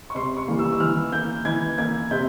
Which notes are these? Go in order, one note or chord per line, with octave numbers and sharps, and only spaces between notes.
C#6
C3 C6
C#6
E3 G3 A#3
E6
E6
E3 F6
A#3 G6
E3 G#6
A#3 G#6
C3 G6